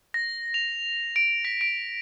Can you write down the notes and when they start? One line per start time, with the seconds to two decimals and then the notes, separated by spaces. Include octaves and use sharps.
0.14 A#6
0.54 F7
1.16 D7
1.45 B6
1.61 D7